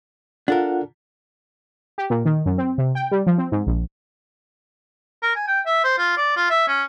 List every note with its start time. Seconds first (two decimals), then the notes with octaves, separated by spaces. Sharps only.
0.48 D4 F4 A4 A#4 F#5
1.98 G4
2.10 A#2
2.25 D#3
2.46 F#2
2.58 C4
2.78 C3
2.95 G5
3.11 G3
3.27 F3
3.38 C4
3.52 G#2
3.67 A#1
5.22 A#4
5.36 G#5
5.47 G5
5.66 E5
5.84 C5
5.98 F4
6.17 D5
6.37 F4
6.50 E5
6.67 C#4